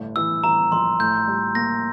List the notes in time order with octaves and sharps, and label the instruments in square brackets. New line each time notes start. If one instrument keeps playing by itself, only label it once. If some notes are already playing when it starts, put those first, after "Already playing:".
Already playing: [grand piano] G1 A2
[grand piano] E3 [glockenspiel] E6
[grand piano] E3 [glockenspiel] A#5
[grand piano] A#1 [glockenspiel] C6
[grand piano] A2 [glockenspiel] G6
[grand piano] G3
[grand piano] A#3 [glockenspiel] A#6